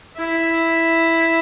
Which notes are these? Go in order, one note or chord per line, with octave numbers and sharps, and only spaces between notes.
E4